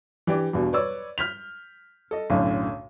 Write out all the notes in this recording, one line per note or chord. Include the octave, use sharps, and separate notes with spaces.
E3 D4 G4 D5
E2 G2 B2
B4 C#5 D5 E6
F6 G6 B6 F7
A4 D#5
B1 F#2 A2 D3